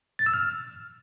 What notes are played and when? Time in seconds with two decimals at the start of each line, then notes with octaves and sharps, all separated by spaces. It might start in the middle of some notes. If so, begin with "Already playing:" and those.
0.19 A6
0.26 E6
0.34 F6